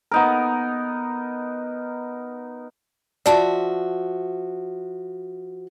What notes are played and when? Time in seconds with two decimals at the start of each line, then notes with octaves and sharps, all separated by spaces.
0.11 B3 D#4 A#4
3.26 F3 F#4 D5 E5 A5